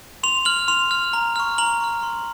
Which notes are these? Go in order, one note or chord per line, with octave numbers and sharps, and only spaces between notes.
C6 F7
F6 F#7
C6 F7
F6
A#5
C#6 F6
A#5 F#7
C#6 F6
C6